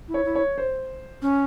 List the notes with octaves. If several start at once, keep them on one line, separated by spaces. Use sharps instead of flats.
E4
C#5
E4
C#5
C5
C#4